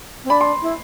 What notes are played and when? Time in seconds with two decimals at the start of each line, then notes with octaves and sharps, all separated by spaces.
0.24 C4
0.30 D4 B5
0.41 C6
0.62 E4